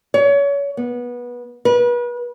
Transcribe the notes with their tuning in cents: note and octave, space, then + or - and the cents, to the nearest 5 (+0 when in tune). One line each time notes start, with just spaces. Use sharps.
C#5 +30
B3 -20
B4 -35